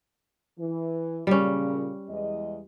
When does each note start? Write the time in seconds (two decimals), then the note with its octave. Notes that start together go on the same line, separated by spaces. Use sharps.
0.58 E3
1.27 A#2 C#3 G3 C#4
2.08 E2 G#3 D#5